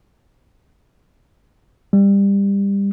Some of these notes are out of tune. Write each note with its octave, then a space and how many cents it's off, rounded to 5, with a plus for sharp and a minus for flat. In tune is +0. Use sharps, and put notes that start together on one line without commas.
G3 +20